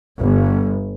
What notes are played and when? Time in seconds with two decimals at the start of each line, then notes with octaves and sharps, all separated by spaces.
0.20 G1